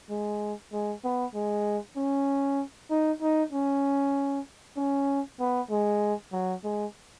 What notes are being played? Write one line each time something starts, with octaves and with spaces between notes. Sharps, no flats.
G#3
G#3
B3
G#3
C#4
D#4
D#4
C#4
C#4
B3
G#3
F#3
G#3